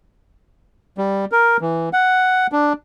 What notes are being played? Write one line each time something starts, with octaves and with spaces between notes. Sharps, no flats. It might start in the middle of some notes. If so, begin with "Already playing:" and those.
G3
A#4
E3
F#5
D4